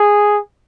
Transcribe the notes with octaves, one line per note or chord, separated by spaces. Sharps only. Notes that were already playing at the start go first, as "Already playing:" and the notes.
Already playing: G#4